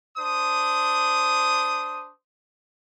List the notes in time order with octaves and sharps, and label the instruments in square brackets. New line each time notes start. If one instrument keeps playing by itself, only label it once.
[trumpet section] D4 C5 D#6